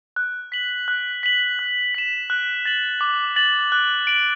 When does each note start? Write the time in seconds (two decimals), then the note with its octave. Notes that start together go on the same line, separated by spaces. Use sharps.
0.16 F#6
0.52 B6 F#7
0.88 F#6
1.23 B6 F#7
1.59 F#6
1.95 B6 E7
2.30 F#6
2.65 A6 F#7
3.01 D6
3.36 A6 F#7
3.72 F#6
4.07 D7 F#7